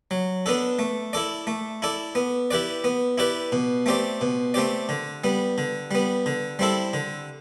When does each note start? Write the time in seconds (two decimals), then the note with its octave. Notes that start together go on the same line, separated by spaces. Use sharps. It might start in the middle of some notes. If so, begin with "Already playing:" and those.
0.11 F#3
0.46 B3 D4 A4
0.79 A3
1.13 E4 A4 D5
1.47 A3
1.82 E4 A4 D5
2.15 B3
2.51 E4 G4 B4 D5
2.84 B3
3.18 E4 G4 B4 D5
3.52 B2
3.86 A3 C4 G4 D5
4.21 B2
4.54 A3 C4 G4 D5
4.89 D3
5.24 G3 B3
5.58 D3
5.91 G3 B3
6.26 D3
6.59 G3 C4 E4 A4
6.93 D3